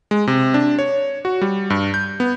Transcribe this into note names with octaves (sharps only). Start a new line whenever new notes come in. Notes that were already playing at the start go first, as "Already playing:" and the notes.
G#3
C3
D4
C#5
F#4
G3
G2
G6
B3